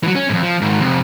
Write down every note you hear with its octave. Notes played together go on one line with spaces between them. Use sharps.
E3 F#3
C#4
F2 G#2
F3
G#2 D#3
F2 C3